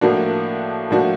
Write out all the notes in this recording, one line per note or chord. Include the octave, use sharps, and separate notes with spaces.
A2 F3 A#3 D4 F#4
A2 F3 A#3 D4 F#4